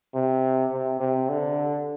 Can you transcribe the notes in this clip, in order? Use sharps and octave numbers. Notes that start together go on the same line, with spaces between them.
C3
C3
C3
D3